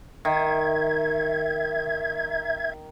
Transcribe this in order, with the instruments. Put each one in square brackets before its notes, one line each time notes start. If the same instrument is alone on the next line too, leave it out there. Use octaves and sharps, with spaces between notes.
[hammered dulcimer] D#3 [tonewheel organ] E5 G#6